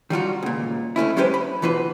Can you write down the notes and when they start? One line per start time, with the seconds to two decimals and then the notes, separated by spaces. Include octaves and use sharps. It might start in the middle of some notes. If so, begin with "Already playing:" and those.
0.10 D#3 G3 F4 F#4
0.43 C#2 A#2
0.96 D2 A3 C#4 E4
1.17 F#3 G#3 C#4 G4 B4 C5
1.34 B5
1.62 D2 B2 E3 F4 B4